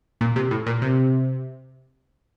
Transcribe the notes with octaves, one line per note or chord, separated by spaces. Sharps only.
A#2
C3
A2
A#2
C3